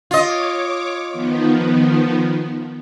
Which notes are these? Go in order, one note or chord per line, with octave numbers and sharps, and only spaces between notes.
F4 C#5 D#5 D6
D#3 F3 B3